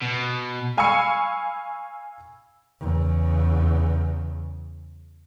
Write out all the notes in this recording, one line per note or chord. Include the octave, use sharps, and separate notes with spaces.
B2
F5 G#5 B5 C#6 E6 C#7
E2 C#3